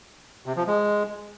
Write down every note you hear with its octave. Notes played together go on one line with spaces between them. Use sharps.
C3
F3
G#3